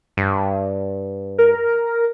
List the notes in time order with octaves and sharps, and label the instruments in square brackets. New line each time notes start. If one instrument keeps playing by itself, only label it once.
[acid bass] G2
[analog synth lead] A#4